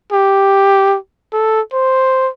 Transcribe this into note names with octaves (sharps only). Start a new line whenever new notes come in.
G4
A4
C5